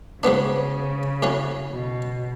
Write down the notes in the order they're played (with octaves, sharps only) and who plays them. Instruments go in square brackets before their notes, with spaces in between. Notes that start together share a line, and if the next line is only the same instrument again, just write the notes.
[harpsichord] G#2 F#3 B3 D4 [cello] C#3
[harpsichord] A2 F#3 C#4
[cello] B2